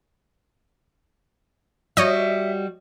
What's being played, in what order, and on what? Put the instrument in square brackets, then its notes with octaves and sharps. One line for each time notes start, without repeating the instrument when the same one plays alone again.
[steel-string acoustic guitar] G3 F#4 [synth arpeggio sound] C#5 D#5 [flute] E5